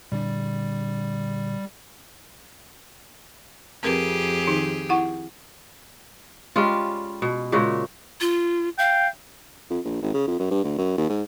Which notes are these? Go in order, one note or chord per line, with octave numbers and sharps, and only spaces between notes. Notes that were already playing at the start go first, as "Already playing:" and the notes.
A#2 D3 G3 D4
F2 C4 G4 G#4 A#4 B4
D#3 D#4
E4 F#5 C#6
G3 G#3 C#4 F4
B2
A#2 C#3 G#3 F#4
F4
F5 G5
F2
A#1
G#1
C#3
F2
F#2
G2
D2
F#2
D#2
G#2